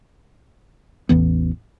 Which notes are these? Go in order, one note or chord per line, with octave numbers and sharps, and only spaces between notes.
A1 E2 E3 B3